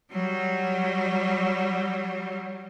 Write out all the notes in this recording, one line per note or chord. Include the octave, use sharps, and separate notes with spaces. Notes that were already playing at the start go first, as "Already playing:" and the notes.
F#3 G3